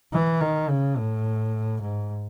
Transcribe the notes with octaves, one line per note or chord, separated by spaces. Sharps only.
E3
D#3
C#3
A2
G#2